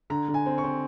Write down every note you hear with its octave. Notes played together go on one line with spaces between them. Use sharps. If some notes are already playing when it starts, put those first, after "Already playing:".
D3 A#5
D3
G#5
C4
C#6
C4